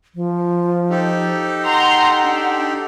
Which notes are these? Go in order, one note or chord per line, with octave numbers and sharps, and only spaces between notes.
F3
D#4 G4 A4
F#5 A#5 C6
D4